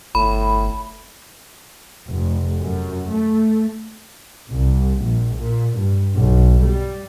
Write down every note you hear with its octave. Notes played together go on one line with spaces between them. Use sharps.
G1 A2 B5
F1
F#2
A3
C2
A#1
A#2
G2
B1
G3